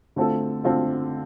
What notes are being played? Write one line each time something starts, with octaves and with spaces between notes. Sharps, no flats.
D3 A3 C4 F4 A4
D3 A3 C4 F4 A4